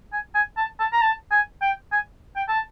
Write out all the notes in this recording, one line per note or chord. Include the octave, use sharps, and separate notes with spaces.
G#5
G#5
A5
A5
A#5
A5
G#5
G5
G#5
G5
A5